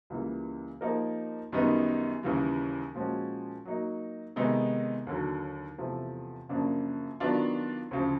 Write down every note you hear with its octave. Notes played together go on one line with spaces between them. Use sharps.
C#2 C#3 E3 G3 A#3
F3 A#3 D#4 G4 A#4
F#2 D#3 G3 B3 D#4
D#2 C#3 E3 G3
A#2 F3 G#3 C#4 F#4
F#3 A#3 D#4
C3 D#3 G#3 B3 D#4
D#2 D3 F#3
E2 C3 F3 A3
F#2 C#3 F3 A#3 D4
D#3 F#3 B3 D4 F4
D2 C#3 F3